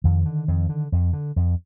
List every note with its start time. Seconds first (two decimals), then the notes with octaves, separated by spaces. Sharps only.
0.04 F2 D#3
0.26 D3
0.48 F2
0.69 D3
0.92 F2
1.13 D3
1.36 F2